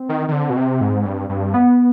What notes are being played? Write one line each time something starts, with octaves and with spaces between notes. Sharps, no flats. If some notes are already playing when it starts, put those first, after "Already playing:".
Already playing: C4
D#3
D#3
D3
B2
C3
G#2
G2
G2
B3